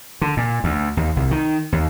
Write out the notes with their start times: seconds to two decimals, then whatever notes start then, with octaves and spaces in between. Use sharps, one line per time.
0.21 D3
0.37 A#2
0.64 D2
0.97 D#2
1.16 C2
1.31 D#3
1.72 D#2